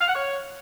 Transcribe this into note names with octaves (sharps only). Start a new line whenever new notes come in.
F5
F#5
C#5